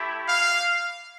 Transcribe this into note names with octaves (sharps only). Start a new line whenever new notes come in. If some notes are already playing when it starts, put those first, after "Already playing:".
Already playing: A3 E4 G4
F5